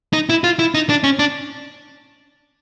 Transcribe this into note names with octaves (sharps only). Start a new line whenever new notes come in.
D#4
E4
F4
E4
D#4
D4
C#4
D4